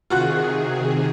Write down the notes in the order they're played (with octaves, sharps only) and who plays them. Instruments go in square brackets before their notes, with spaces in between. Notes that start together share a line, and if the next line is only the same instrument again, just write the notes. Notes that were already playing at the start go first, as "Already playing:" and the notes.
[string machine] C3 D#3 G#4 [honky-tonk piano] F4 F#4 F#6